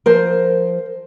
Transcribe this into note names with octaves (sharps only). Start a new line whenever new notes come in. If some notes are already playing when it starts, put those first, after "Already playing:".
F3 A#4 C5